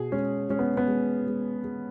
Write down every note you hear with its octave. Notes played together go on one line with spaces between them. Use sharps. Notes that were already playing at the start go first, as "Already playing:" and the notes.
Already playing: B2 G#4
G#3 C#4
G#3 C#4
B3
B3
G#3
G#3
G#3